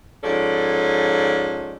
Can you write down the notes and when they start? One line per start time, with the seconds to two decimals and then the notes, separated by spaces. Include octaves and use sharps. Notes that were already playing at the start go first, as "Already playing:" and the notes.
0.24 G#2 F3 C#4 A4 D5